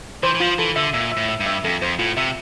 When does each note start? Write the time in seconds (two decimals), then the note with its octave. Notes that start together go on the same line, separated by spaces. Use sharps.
0.23 E3 C5
0.35 E3
0.40 F3 F4
0.58 E3 A4
0.76 D3 E5
0.94 A#2 E5
1.12 E5
1.17 A2
1.29 E5
1.40 G2
1.46 E5
1.64 F2 A4
1.81 F2 C5
1.99 A2 F4
2.17 C3 E5